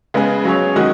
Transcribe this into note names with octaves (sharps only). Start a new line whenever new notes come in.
C#3 G#3 B3 G#4
F#3 C#4 G#4 C#5
D#3 G#3 C#4 F#4 D#5